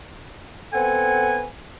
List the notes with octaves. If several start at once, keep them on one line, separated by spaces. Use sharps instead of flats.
B3 C4 A4 F#5 G#5